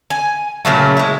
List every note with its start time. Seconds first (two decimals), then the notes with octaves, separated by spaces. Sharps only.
0.10 G#5
0.65 A#2 C#3 F#3 A3
0.97 G#3 E4